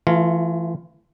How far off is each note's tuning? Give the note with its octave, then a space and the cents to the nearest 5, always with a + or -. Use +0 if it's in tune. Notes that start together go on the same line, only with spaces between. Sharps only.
E3 +25 A3 +0 F4 -5